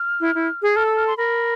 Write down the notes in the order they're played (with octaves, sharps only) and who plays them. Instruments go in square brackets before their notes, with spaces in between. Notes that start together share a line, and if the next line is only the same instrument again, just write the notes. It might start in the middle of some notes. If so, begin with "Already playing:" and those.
Already playing: [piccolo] F6
[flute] E4
E4
G#4
[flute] A4 [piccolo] F6
[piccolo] E6
F6
C6
[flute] A#4 [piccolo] B5